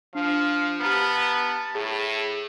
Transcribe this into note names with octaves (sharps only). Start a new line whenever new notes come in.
F3 D4 F5
B3 G4 A5 A#5 F6
A2 G#4